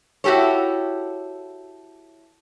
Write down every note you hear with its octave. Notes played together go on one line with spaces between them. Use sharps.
E4 F#4 G4 A4 C#5